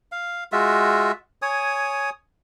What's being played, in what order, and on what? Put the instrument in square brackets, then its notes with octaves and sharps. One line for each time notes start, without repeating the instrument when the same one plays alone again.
[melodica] F5
G#3 F4 F#4 E5
C#5 G#5 D#6